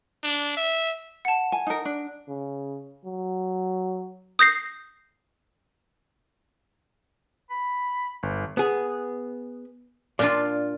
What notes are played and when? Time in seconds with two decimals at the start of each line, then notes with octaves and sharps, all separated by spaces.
0.24 D4
0.57 E5
1.25 F#5 A5
1.52 G#5
1.67 D#4 A#4
1.85 D4
2.29 C#3
3.05 F#3
4.39 D#6 G6 A#6 C7
7.50 B5
8.23 G1
8.57 B3 G#4
10.19 A#2 D4 F4 D5 F5